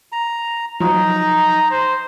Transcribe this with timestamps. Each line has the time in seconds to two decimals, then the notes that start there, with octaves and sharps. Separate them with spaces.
0.12 A#5
0.80 F3 F#3 D#4 A#5
1.71 C5